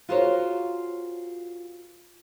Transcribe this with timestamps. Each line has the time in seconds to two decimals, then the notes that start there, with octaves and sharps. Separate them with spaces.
0.09 F4 F#4 G#4 A#4 C5 C#5